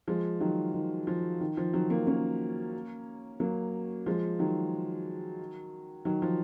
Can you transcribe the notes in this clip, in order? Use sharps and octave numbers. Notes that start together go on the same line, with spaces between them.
F3 G#3
D#3 F#3
D#3
F3
D#3
F3
D#3 F#3
F#3 A#3
A#3 C#4
F#3 A#3
F3 G#3
D#3 F#3
D#3 F#3
F3